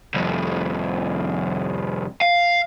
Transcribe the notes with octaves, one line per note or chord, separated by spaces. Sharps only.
C2 F2
F5